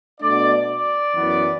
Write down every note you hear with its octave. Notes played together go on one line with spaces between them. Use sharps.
B2 A3 D4 D5
D5
F#2 E3 B3